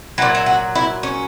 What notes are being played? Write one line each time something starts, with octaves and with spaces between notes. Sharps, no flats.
A#2 F#3 E4
E4
F#4
E4
C#4